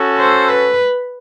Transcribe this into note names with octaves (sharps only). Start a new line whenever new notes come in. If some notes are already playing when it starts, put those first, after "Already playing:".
Already playing: C#4 F#4 A4
C5
B4